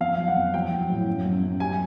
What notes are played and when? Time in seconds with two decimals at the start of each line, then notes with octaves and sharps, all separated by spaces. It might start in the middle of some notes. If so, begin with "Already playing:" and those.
0.01 F2 F5
0.18 F#3
0.28 F#5
0.37 F2
0.54 F#3 G5
0.72 F#3
0.90 A2
1.07 F#2
1.25 F#2
1.43 F#2
1.60 G3 G#5